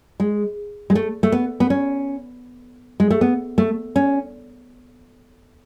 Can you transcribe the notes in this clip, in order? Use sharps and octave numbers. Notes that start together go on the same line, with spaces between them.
G#3
G#3
A3
A3
B3
B3
C#4
G#3
A3
B3
A3
C#4